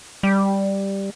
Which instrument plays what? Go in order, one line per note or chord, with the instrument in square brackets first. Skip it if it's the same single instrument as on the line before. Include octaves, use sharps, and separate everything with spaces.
[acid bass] G3